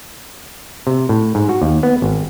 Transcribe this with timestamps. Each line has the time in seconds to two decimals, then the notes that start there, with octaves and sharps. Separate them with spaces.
0.87 C3
1.09 A2
1.35 G#2
1.49 F#4
1.62 D#2
1.83 B3
2.02 G#1